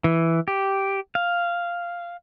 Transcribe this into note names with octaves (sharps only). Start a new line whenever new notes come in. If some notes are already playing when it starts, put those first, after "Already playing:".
E3
G4
F5